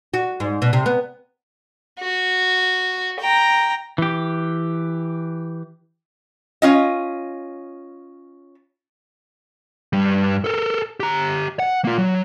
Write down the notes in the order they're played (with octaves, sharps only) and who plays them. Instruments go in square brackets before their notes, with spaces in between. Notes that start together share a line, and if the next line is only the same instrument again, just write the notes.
[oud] F#4
G#2
B2
C3
B3
[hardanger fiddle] F#4
G5 A#5
[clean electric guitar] E3 G4
[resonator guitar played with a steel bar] C#4 F4 D#5
[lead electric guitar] G2 G3
A4 A#4
G4 A#5
F#5
A#3 F4
F#3